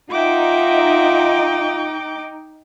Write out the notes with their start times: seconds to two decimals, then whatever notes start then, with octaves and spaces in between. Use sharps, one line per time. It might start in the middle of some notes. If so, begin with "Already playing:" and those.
0.10 D#4 F4 E5 F#5 G5 D6